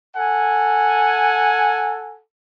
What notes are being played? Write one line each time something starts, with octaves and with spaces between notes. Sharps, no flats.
A4 F#5 G#5